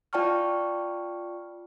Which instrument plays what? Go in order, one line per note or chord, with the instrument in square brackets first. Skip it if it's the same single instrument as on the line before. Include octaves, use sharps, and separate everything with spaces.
[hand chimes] F4 D5 G5 A5 C#6 F6